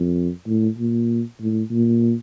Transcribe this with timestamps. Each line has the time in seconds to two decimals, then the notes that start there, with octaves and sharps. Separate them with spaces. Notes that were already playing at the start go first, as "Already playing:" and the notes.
Already playing: F2
0.47 A2
0.78 A#2
1.40 A2
1.70 A#2